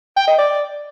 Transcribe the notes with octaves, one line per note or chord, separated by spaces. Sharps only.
G5
D#5
D5